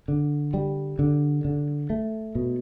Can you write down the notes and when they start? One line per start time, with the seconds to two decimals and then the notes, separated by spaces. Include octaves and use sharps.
0.08 D3
0.54 G3
0.99 D3
1.45 D3
1.90 A3
2.35 B2